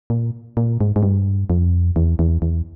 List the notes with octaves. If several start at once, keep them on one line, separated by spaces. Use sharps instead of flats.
A#2
A#2
G#2
G#2
G2
F2
E2
E2
E2